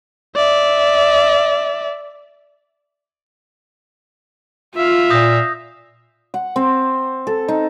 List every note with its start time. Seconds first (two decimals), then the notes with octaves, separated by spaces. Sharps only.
0.36 D5 E5
4.77 F4 E5 F5
5.10 A#2 D#6 G6 A#6
6.34 F#5
6.56 C4
7.27 A4
7.48 D#4